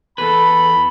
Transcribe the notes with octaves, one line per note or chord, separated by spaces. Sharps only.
E2 A4 B4 B5